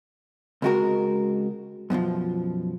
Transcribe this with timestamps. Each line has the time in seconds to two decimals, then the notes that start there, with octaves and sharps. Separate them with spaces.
0.62 C#2 C3 G#3 F4 F#4 A#4
1.90 F#2 B2 D3 F3